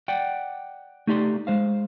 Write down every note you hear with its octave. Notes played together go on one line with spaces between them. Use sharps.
D5 F#5 G5
A3 D#4 G4 D5 C6
G#3 C5 F5